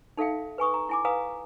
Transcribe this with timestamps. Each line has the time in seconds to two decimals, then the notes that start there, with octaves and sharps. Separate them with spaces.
0.17 D#4 A4 E5 F5 G5
0.58 B4 G#5 C#6 D#6
0.74 A#5
0.89 E4 G#5 D6
1.05 B4 F5 G#5 A#5 D#6